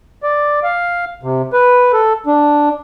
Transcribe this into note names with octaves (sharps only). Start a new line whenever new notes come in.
D5
F5
C3
B4
A4
D4